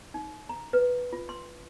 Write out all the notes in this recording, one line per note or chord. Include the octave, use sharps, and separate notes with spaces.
D#4
A#5
B4
F4
C6